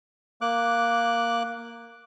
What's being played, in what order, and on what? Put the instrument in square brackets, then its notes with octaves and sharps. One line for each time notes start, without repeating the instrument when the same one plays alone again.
[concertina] A#3 D6 F#6